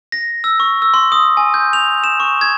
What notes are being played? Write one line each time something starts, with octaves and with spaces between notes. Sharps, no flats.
A#6
E6
C#6
E6
C6
D#6
G#5
G6
F7
E7
C#6
G#6